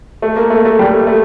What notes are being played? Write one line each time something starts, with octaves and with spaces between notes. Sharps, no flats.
A3
A#3
A3
A3
G3
A3
A3